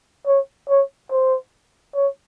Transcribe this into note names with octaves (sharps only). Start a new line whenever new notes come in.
C#5
C#5
C5
C#5